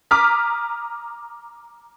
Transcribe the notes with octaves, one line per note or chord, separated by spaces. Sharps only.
A#5 D6 D#6 F6 B6